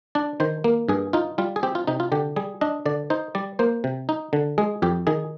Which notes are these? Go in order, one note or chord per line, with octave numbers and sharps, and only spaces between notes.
D4 D5
D#3 C5
A#3
G2 G#4
D#4 F4
G3 F4
G#4
C4 G4
F4
C3 D#4
F4
D3 G4
G3 G#4
D4 D#5
D3 D5
D#4 C5
G3 D5
A#3 C5
C3
D#4
D3
G#3 G#4
F2 G4
D#3 G#4